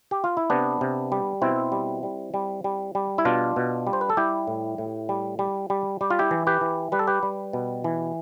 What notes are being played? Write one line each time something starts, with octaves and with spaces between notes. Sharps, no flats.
G4
F4
E4
C3 B3 D4
C3
G3
B2 C4 E4
G3
G3
G3
G3
G3
E4
B2 D4 F4
B2
G3
C5
B4
A4
G3 E4 G4
A2
A2
G3
G3
G3
G3 G4
F4
E4 G4
E3
G4 B4
E3
G3 B4
A4
G4 B4
G3
B2
E3